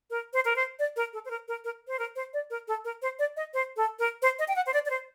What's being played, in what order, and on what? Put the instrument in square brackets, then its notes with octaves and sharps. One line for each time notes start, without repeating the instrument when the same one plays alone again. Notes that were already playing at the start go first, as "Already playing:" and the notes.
[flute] A#4
C5
A#4
C5
D5
A#4
A4
C5
A#4
A#4
A#4
C5
A#4
C5
D5
A#4
A4
A#4
C5
D5
D#5
C5
A4
A#4
C5
D#5
G5
F#5
C5
D5
D5
C5